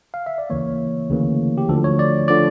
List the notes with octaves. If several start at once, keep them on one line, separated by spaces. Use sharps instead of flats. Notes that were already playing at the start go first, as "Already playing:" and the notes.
F5
E5
D5
D2 C#3 E3 A#3 C#5
D2 C#3 E3 A#3
G4
D2 D3 F3 A4
C#5
D5
D3 F3 D5